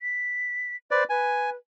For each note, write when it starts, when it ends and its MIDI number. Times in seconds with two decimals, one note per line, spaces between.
0.01 0.76 95
0.91 1.04 71
0.91 1.03 72
0.91 1.04 74
1.09 1.55 71
1.09 1.50 80